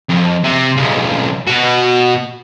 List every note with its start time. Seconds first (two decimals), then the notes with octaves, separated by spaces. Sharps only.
0.09 F2
0.44 C3
0.77 B1 C#3
1.47 B2 F#4